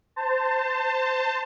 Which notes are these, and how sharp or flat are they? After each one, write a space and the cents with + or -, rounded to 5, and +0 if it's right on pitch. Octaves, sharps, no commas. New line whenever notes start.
C5 -15 A5 +25